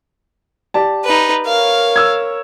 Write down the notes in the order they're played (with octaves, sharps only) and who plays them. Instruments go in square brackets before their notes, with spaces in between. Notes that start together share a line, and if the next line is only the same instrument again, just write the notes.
[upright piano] G4 D5 A5
[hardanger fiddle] D#4 B4
[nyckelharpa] A#4 C#5 [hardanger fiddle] F5
[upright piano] E6 G#6